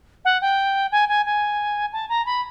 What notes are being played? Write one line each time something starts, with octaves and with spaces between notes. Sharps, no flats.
F#5
G5
G#5
G#5
G#5
A5
A#5
B5